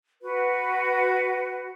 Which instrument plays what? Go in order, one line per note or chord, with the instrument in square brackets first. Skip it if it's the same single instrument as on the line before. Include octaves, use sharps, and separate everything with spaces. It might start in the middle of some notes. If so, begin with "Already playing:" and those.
[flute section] F#4 B4